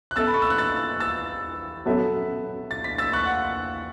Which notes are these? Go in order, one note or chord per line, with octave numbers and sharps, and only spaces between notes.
F#6
B3 A4 E5 E6 A6
B5
C#6
E6
F#6
E6 A6
E6 A6
F#3 B3 A4 E5
A6
B6
E6 A6
C#6 F#6
F#5